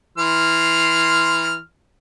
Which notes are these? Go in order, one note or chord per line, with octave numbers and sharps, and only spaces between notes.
E3 C6 F6